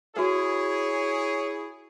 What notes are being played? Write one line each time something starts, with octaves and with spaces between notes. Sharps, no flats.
E4 F#4 G#4 B4 C#5